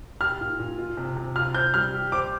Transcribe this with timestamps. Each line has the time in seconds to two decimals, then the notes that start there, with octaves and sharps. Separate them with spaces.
0.21 G4 F6
0.41 A#2
0.59 A#2
0.78 F4
0.97 C3
1.17 C3
1.36 F4 F6
1.54 C5 G6
1.74 G3 F6
1.93 G4
2.12 C5 D6